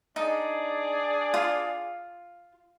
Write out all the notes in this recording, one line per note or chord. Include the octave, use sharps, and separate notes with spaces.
D4 D#4 G#4 D5
F4